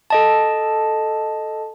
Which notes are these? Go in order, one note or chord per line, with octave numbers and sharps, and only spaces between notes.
A4 D#5 A5